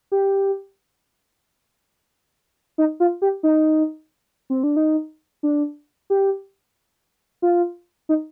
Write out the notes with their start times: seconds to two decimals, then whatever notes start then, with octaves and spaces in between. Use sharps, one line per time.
0.12 G4
2.78 D#4
3.00 F4
3.22 G4
3.43 D#4
4.50 C4
4.64 D4
4.76 D#4
5.43 D4
6.10 G4
7.42 F4
8.09 D#4